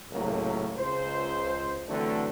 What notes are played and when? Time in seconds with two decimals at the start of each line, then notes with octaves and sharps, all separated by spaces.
0.12 C#2 A2 C3 F#3 A#3
0.76 C#2 C5
1.87 D3 E3 F#3 A3 C4